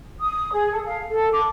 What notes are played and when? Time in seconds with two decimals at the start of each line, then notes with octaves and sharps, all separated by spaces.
0.20 D#6
0.53 G#4
0.73 A4
0.85 F5
1.09 A4
1.31 D6